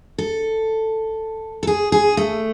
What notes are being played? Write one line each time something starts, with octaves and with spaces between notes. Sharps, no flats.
A4
A4
G#4
G#4
A3